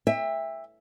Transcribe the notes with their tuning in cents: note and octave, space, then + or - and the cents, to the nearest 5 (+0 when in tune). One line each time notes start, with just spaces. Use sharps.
E5 +0 G5 +40